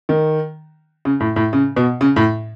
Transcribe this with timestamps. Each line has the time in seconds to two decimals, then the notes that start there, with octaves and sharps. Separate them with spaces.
0.09 D#3
1.05 C#3
1.20 A2
1.36 A2
1.53 C#3
1.76 B2
2.01 C#3
2.16 A2